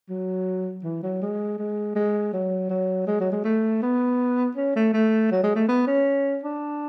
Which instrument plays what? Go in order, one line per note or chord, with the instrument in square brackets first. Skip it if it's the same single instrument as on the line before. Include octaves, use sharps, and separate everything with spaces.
[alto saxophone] F#3
E3
F#3
G#3
G#3
G#3
F#3
F#3
G#3
F#3
G#3
A3
B3
C#4
A3
A3
F#3
G#3
A3
B3
C#4
D4